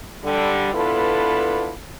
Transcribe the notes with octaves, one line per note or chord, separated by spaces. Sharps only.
D3 G3
B3 D4 E4 F4 A4 B4